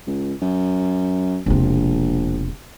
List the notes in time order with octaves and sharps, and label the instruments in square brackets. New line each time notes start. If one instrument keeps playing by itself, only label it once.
[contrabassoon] C#2
F#2
[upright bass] E1 C3 [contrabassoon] A#1